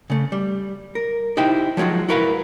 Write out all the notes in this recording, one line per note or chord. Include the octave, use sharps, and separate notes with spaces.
C#3 A3
G3
A#4
D#4 E4 G4 C5 G5
F3 F#3 G#3 F4 F#4
E4 F#4 A#4 B4 C#5 F5